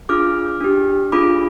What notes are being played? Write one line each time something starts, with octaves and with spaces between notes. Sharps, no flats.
D4 F4 G#4 D6 F6
D4 G4
D4 F4 G#4 B5 D6